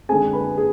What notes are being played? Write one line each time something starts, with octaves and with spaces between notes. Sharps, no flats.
D3 G#3 C4 G#4 G#5
B4 B5
G#4